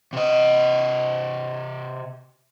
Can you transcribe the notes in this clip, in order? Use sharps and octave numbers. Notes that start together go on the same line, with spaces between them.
C3 D#5